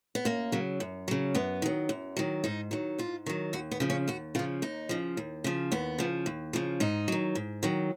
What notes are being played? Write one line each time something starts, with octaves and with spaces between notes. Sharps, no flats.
B3
F#2 A#3
C#3 F#3
F#2
C#3 F#3
F#2 B3
D#3 F#3
F#2
D#3 F#3
G#2 D#4
D#3 F#3
G#2 F4
D#3 F#3
D#2 F#4
B3
C#3 F3
C#4
D#2 F#4
C#3 F3 F4
D#2 D#4
C#3 F3
D#2
C#3 F3
D#2 B3
C#3 F3
D#2
C#3 F3
G#2 D#4
D#3 F#3
G#2
D#3 F#3